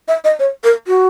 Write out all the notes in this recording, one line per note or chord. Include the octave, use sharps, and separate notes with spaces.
E5
D#5
C#5
A#4
F#4